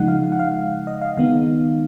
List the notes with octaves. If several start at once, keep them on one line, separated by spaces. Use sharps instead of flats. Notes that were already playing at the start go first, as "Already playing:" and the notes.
Already playing: C#3 F3 G#3 D#4 F#5
F5
F#5
F5
D#5
F5
D#3 G#3 B3 D#4 F5